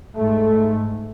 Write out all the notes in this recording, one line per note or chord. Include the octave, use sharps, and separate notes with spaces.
G#2 A3